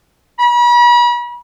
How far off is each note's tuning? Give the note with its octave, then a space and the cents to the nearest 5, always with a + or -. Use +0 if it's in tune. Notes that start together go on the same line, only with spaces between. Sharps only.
B5 -40